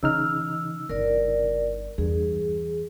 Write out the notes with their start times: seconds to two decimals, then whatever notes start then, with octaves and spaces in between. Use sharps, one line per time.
0.03 C#3 E3 D#4 E6 F6
0.89 G1 A#4 D5
1.98 E2 G2 G#4